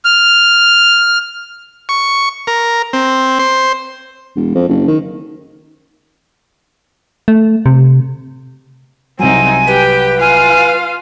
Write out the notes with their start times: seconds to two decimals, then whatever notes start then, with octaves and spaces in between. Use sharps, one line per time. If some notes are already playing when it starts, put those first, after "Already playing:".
0.05 F6
1.89 C#6
2.47 A#4
2.93 C4
3.39 C5
4.36 E1
4.55 F2
4.68 F#1
4.88 D#3
7.28 A3
7.66 C3
9.19 C2 F#3 C4 D#4 G#5
9.67 G4 B4 G5
10.20 F4 F5 G#5